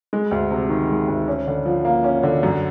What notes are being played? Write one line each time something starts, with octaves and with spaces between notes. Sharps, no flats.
G#3
D2
C3
D#3
G#3
D2
C#4
D3
F3
A#3
C#4
D3
F#2